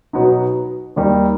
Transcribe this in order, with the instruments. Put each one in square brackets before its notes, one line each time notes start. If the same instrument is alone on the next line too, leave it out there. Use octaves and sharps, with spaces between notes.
[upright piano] B2 F#3 B3 D#4
D#2 D#3 G3 D#4